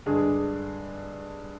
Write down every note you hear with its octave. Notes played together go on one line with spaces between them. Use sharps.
G2 D3 G#3 D4 G#4